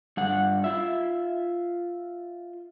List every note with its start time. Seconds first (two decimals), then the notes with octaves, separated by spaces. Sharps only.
0.17 G2 F#5
0.64 F4 E5